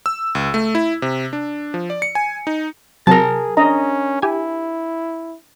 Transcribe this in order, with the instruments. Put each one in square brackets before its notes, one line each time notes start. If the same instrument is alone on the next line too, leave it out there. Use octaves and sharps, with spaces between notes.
[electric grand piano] E6
C#2
A3
E4
C3
D4
F3
D5
C#7
G#5
D#4
[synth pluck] C3 F#3 [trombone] G#4 [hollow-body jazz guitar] A#4 A5
[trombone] C#4 [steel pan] D4 D#5 A#5
[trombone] E4 [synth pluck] G4 G#5